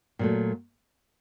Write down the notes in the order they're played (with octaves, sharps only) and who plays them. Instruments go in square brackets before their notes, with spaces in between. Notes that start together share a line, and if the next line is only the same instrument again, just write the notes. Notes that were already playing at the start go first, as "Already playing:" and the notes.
[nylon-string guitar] A#2 F#3 A3